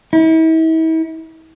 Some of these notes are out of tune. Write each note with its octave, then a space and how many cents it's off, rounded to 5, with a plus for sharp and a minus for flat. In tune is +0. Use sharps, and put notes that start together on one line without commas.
E4 -40